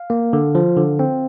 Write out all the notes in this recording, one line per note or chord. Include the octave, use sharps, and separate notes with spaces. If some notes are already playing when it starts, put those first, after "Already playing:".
Already playing: F5
A#3
D3
F3
D3
C4